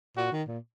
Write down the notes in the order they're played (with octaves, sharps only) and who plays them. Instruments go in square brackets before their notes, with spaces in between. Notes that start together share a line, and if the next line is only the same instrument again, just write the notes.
[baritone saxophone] A#2 [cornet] F#4
[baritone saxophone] D#3
A#2